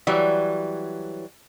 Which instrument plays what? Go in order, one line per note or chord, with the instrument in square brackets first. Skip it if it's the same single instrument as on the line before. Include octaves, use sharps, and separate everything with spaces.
[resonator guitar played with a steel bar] E3 F#3 G3